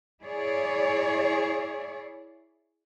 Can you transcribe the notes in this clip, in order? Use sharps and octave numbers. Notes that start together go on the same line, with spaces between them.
E4 G#4 C#5 D5